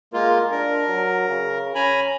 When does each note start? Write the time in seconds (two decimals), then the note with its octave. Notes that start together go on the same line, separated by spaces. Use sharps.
0.14 G#3 A#3 F4 A#4
0.52 D4 A#4
0.87 F#3
1.29 C#3
1.75 C#4 G#5 A#5 B5